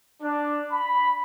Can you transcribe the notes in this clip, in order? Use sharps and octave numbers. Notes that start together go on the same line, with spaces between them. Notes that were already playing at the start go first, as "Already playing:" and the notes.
D4
B5